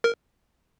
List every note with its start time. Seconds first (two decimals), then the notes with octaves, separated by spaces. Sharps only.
0.04 A#4